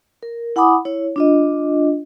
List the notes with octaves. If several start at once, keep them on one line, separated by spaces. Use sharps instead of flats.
A#4
E4 F#5 G#5 B5 D6 D#6
E4 C#5
D4 F4 D#5